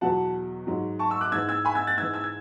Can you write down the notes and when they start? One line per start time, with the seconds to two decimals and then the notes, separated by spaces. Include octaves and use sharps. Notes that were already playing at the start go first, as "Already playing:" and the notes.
0.01 E2 B2 F#3 F#5 A5
0.67 G#2 F#3
0.99 A5 C#6
1.10 C#6 E6
1.21 D6 F#6
1.32 G#2 E6 G#6
1.36 E3
1.49 E6 G#6
1.65 G#5 B5
1.75 E6 G#6
1.87 F#6 A6
1.97 G#2 E6 G#6
2.02 E3
2.14 E6 G#6
2.24 G#6